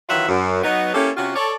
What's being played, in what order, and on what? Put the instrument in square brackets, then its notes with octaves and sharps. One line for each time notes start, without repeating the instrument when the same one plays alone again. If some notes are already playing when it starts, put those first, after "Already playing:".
[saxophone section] D#3 E3 F#3 F4 E5 F#5
F#2
F#3 B3 D#4
A#3 C#4 E4 G4 A4
C3 C#4 F4 F#4
A4 C#5 D5